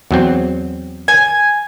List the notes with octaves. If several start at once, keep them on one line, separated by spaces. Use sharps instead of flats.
E2 F#3 C4
G#5